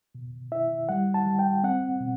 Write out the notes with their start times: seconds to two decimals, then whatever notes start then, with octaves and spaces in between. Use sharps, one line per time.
0.15 B2
0.52 E4 E5
0.89 G3 F#5
1.14 A5
1.26 G3
1.39 G5
1.63 C4 F#5
2.00 B2